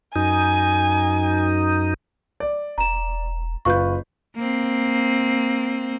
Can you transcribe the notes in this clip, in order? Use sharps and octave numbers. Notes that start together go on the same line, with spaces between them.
F#2 D#4 G#5
D5
E1 A#5 E7
F#1 F4 B4 C#6 G6
A#3 C4